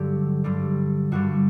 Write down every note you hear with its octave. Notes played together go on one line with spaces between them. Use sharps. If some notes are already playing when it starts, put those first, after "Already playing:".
Already playing: G2 D3 F#3 G4 A4
G2 D3 G3
G2 D3 G3 F#4